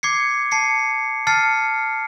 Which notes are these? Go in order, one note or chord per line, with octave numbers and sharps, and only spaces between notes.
D6 G#6 C7 C#7
A5 C7 C#7
A5 F6 A6 C7 C#7